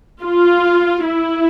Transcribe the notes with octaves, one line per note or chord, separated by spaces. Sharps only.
F4
E4